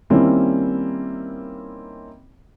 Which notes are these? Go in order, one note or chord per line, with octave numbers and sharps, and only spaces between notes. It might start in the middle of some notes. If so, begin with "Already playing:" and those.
D#3 G3 A#3 C4 C#4 E4